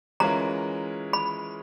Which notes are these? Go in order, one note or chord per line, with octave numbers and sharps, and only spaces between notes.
E3 G#3 C#4 F4 A#4 A#5
B5